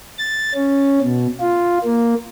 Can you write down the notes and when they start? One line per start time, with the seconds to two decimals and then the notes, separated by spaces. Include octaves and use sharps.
0.18 A6
0.55 C#4
1.01 B2
1.40 F4
1.84 A#3